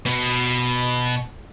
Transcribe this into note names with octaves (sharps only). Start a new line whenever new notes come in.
B2